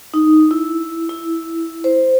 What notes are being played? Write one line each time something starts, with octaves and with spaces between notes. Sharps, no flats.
D#4
E4
E4
C5